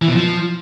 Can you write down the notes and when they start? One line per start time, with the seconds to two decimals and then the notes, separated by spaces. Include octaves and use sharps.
0.02 E3
0.08 B2
0.15 F3